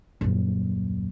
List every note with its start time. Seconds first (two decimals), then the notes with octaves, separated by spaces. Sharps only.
0.21 D#1 F#2